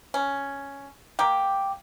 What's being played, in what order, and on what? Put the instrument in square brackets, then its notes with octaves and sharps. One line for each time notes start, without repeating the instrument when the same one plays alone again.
[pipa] C#4
[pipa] A#3 G4 [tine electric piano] G5 D6